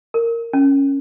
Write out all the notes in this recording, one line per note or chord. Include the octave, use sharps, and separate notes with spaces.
A#4
C#4